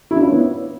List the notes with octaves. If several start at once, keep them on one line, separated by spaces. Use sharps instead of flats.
E4
D4
F4
C#5
B3